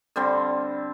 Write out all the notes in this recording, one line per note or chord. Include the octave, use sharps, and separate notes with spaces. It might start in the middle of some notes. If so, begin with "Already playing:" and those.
D3 G3 C4